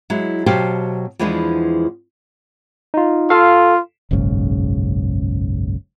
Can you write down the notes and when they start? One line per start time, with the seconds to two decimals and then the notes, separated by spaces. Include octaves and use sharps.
0.10 F#3 G#3 E4
0.46 B2 F#3 G4 C5 F5 A5
1.19 E2 E3 F3 G#3 B3 D4
2.94 D#4 F4
3.30 F4 A4 F5
4.11 F#1 B1 G#2 C#3